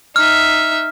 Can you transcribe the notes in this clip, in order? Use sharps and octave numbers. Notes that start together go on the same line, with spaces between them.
D#4 E5 F6